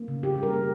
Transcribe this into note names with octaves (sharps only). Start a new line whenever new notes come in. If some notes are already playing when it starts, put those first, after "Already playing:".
Already playing: A#3
C#3
C#3 G4
G3 A#4
A#3